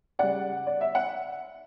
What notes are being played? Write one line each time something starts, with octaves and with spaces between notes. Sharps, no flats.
C#3 G3 D5 F#5
D5
E5
F#5